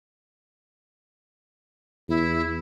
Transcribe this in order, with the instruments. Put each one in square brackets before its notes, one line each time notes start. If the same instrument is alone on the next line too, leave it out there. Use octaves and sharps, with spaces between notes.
[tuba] E2 [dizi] E4